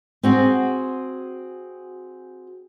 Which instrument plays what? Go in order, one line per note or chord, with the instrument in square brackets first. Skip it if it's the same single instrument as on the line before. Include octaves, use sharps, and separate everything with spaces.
[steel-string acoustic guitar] C4 F#4 G#4